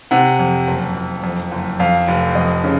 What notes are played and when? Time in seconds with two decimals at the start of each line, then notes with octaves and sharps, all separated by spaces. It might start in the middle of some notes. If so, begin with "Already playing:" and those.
0.11 C3 F#5
0.39 F2
0.67 F#1
0.95 F#1
1.23 F2
1.52 F#1
1.79 F2 F5
2.08 F1
2.35 F2 D#5
2.64 C#3